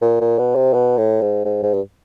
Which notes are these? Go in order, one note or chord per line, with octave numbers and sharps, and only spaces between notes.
A#2
A#2
B2
C3
B2
A2
G#2
G#2
G#2
G2